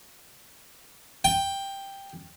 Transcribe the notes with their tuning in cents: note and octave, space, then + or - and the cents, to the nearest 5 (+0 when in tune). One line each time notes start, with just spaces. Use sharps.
G5 +5